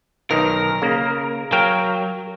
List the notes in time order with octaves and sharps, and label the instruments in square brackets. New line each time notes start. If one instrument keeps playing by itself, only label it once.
[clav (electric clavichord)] B1 D#3 [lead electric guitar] A#4
[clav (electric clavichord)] C#3 A#3
[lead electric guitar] F#3 [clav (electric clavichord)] A#4 F5 G5